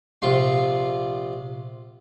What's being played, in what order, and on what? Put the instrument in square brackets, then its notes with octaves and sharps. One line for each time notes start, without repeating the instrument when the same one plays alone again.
[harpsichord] A#1 C3 F4 C6